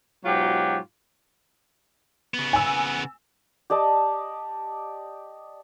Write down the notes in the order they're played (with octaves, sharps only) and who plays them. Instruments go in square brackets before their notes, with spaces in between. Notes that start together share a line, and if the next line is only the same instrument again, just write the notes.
[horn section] G#2 B2 F#3 F4 G4
[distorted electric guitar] C#3 B3
[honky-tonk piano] G#5 E6
[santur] G4 D5 D#5 A5